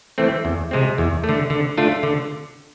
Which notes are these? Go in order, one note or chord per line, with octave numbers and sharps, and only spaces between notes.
E3 A3 C4
E2
C3 G#3 C4
E2
A3
D3
D3
A3 D4 F4
D3